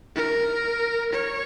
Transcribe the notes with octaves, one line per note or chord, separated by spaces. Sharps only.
A#4
C#5